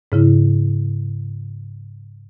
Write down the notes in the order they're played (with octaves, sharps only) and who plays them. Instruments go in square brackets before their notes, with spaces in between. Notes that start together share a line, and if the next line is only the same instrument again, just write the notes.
[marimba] G#2 C#3 E4